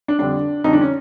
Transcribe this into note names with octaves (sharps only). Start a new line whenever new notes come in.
D4
F2 D3 G3 D4
F2 D3 G3 D#4
D4
C#4